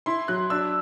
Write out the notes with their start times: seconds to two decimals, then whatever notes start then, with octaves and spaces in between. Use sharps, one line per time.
0.06 E4 C6
0.28 F#3 F#6
0.50 D4 E6